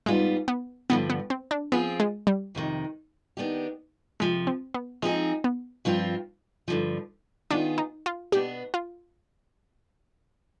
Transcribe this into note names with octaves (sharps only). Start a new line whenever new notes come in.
G#2 G3 G#3 B3 F4
B3
G2 D3 F3 B3
B3
C4
D4
F3 B3 C4 F4 G#4
G#3
G3
F2 C3 D#3
D#3 B3 D4 G4
F2 C3 F3 G#3
C4
B3
F3 G#3 C4 D#4 G#4
B3
G2 F3 C4 F4
G2 D3 F3
D#3 B3 D4 F4 G#4
D#4
F4
B2 B3 D4 G4
F4